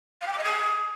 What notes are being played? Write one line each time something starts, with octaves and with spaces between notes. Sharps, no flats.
F5
G5
D6
D#5
D#6